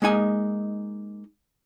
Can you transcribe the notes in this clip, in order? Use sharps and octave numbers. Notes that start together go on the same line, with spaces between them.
G#3 A#3 D#4 G#5